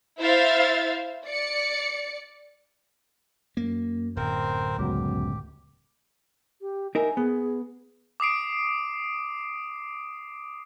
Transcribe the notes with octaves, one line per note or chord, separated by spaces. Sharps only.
E4 C5 E5 F5 A6
D5 C#7
F#2 A#3
D1 C4 A#4 C5
C#2 F#2 F#3 B3 G4
G4
D#4 A#4 E5 G#5
B3 G#4
D6 D#6 C7 D7